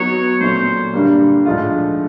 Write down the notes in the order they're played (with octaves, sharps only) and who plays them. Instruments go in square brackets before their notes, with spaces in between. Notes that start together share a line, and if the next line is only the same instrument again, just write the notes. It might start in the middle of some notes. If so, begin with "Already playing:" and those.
Already playing: [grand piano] F#3 B3 D#4 F#4 B4 [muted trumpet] C#5
[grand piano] A#2 F#3 A3 C#4 [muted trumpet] C5
[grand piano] G2 D3 G3 A#3
G#2 F3 A3 D4 F4